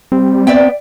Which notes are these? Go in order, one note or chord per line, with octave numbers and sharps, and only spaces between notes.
G3 C4
B3 D5 E5 G5